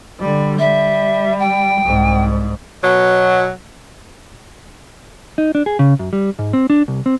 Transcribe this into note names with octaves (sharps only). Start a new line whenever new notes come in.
D3 G3
G3 E5
G5
C2 G#2
B2 F#3
D#4
D4
G#4
C#3
F#2
G3
G#2
C4
D4
C2
C4